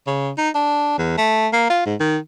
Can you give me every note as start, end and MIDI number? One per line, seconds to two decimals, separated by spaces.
0.07 0.30 49
0.38 0.49 63
0.55 0.95 62
0.98 1.13 40
1.18 1.48 57
1.53 1.69 58
1.70 1.81 65
1.86 1.95 44
2.00 2.17 51